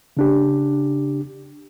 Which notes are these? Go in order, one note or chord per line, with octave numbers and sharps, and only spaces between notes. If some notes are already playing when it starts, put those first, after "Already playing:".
C#3 D4 G4